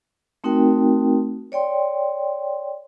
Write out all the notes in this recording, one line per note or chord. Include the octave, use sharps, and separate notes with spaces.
A3 C4 D#4 F#4 A#4 G5
C#5 D5 G5 C6